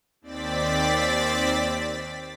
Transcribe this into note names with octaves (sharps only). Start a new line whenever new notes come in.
D#2 C4 D5 A6 B6